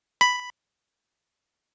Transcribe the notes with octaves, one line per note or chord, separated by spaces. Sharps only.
B5